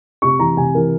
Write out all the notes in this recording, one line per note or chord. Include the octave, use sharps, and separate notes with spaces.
C3 C#6
E3 A#5
C3 G#5
E3 A#4